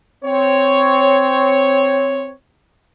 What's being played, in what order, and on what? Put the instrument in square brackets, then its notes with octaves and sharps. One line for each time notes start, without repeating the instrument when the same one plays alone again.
[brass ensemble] C4 C#5